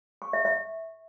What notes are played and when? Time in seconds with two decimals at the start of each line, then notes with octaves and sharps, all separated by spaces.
0.22 C#6
0.33 E5
0.45 E5